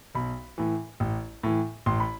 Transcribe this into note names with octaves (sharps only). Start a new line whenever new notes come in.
B1 B5
A2 E3
A1
A2 E3
A1 C6
B5